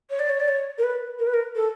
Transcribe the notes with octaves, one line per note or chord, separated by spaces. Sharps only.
C#5
D5
C#5
D5
C#5
A#4
B4
A#4
B4
A#4
A4